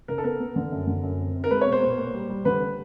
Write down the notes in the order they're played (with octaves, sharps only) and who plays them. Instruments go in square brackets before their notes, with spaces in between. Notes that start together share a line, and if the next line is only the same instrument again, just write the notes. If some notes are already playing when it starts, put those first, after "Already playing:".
[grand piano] C#3 [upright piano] A#4
[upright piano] A4
[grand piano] B3 [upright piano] A#4
[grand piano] B3
D3
F#2
D3
F#2
C4
C4
[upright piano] A#4
[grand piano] G#3 [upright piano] B4
[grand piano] B2 [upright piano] C#5
[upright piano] C5
[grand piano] A#2
A#3
G3
G3
[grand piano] D3 [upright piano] B4